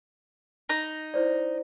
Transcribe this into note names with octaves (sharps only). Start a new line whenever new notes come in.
D#4
E4 C5 D5